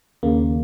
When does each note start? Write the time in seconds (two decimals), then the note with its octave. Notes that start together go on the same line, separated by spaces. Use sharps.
0.23 D#2 C#3 A#3